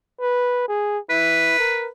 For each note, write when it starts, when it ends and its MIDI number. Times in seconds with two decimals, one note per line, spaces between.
0.21 0.64 71
0.68 0.98 68
1.10 1.58 64
1.10 1.89 71
1.59 1.87 70